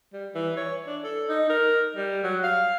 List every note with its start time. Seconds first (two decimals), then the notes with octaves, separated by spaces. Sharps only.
0.13 G3
0.35 E3
0.57 C#5
0.86 D4
1.04 A4
1.29 D#4
1.49 A#4
1.96 G3
2.23 F#3
2.43 F5